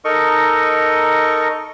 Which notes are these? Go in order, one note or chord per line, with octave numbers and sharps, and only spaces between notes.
D#4 A4 A#4 D#5 C#6